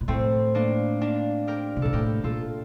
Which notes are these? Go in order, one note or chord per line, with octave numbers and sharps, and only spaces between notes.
A#2
A2 A3 C4
A#3 D4
A#3 D4
G4 A#4
C3
A#2 A4
A2 G4 A#4
A#2 F4 A4